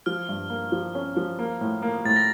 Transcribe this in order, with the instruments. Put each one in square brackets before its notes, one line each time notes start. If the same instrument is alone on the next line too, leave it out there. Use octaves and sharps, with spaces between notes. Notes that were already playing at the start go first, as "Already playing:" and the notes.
[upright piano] F3 [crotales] F6
[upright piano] G2
A#3
F3
C#4
F3
A#3
A2
A#3
[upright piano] A2 [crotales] A6
[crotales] A#6